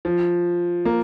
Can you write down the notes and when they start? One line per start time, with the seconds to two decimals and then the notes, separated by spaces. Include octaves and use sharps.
0.05 F3
0.85 A#3